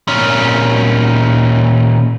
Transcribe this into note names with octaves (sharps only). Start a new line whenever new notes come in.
A#2 C#4